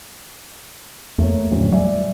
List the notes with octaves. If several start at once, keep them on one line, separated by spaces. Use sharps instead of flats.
F2 A3 A#3 C#5
D1 A#1 C#4
G3 D5 E5 G#5